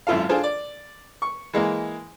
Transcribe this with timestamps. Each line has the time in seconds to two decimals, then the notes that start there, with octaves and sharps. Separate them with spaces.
0.07 G#1 F#2 E4 F4 A4 F5
0.29 D4 F4 G#4 A4 C5
0.44 D5
1.22 C#6
1.53 E3 G#3 A#3